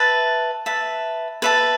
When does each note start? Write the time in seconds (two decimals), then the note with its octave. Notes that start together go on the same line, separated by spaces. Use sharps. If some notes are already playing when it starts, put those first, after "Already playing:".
Already playing: B4 E5 A5
0.66 B4 E5 A5
1.42 B4 E5 A5